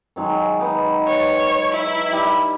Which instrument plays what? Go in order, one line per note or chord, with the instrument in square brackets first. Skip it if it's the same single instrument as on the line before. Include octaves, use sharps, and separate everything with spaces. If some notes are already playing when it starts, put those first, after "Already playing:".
[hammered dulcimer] D#3 F#3 G#3
D#4 B4 D#5
[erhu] C#5
E4
[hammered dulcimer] G3